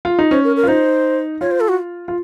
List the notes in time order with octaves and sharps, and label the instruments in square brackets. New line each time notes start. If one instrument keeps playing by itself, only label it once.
[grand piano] F4
D#4
[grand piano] C#4 [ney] C5
[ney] A#4
A#4
[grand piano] F4
[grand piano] D#4 [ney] C5
[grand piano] F4 [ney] C#5
[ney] C5
A4
F#4
[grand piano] F4